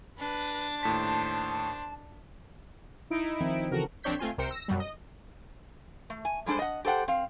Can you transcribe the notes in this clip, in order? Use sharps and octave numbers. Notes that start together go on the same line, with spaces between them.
D4 B4
D#2 A2 C5 A5 B6
D#4 E4 D7
D#3 F3 C4
C#3 E3 F#4 A4 A#4
A#1 C4 D4 C#5 G6 B6
A3 C4 F4 G#5 C6
C2 A#4 C5 G5 C#7
E6 A#6
F#2 B2 F#3 G3
D#5
A3
G#5
G3 G#3 D4 A4 C5
D#5 F#5
G4 A4 C5 F#5 G5
C4 F5